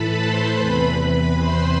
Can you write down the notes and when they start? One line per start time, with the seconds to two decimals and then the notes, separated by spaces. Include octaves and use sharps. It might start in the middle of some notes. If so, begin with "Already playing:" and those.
Already playing: A2 E3 A4 B4 A5 B5
0.18 C5 C6
0.58 E2 C3 E3 B4 B5
1.36 C5 C6